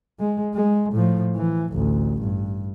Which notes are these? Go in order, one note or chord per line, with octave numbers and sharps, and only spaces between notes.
G#3
G#3
A2 F3
E3
A1 D2
G2